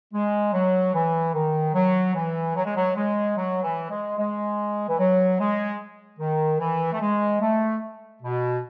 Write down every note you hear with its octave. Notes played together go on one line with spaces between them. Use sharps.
G#3
F#3
E3
D#3
F#3
E3
F#3
G#3
F#3
G#3
F#3
E3
G#3
G#3
E3
F#3
G#3
D#3
E3
A3
G#3
A3
B2